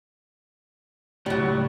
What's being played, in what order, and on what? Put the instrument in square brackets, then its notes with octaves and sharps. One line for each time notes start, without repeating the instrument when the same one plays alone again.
[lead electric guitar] C#2 A2 [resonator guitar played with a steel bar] F#3 G3